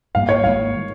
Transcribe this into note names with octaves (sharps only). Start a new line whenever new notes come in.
G#1 G#2 G3 A#3 F5
C#5
G#1 G#2 G3 A#3 F5
D#3